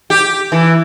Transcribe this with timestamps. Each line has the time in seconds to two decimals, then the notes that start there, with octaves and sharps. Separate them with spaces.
0.10 G4
0.52 E3